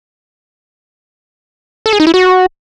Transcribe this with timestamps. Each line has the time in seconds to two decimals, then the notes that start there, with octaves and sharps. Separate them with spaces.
1.86 A4
1.93 G#4
2.00 D#4
2.07 E4
2.14 F#4